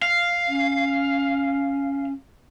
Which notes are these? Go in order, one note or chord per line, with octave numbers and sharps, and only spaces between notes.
F5
C#4